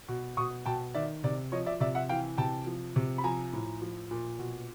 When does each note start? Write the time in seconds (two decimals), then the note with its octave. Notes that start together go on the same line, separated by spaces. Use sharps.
0.09 B2
0.37 B2 C#6 D#6
0.66 B2 G5 A5
0.94 D#3 D5 E5
1.24 C3 D5
1.52 F3 C#5 D#5
1.66 D5 E5
1.80 C3 D5 E5
1.95 E5 F#5
2.09 E3 F5 G5
2.38 C3 G5 A5
2.66 F3
2.96 C3
3.18 B5
3.24 F3 G#5 A#5
3.53 A2
3.82 F3
4.11 A#2
4.39 B2